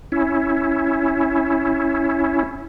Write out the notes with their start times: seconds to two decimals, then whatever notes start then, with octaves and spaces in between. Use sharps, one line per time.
0.12 C#4 E4